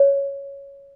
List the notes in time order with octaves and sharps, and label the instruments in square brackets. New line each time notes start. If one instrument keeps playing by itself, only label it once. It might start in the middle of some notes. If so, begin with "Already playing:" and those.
Already playing: [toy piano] C#5